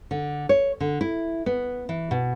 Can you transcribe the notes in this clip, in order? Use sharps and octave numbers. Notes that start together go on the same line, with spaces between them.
D3
C#5
D3
E4
B3
E3
B2